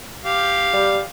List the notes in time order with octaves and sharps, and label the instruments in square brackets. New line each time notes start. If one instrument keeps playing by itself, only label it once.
[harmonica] G4 F5
[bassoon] G3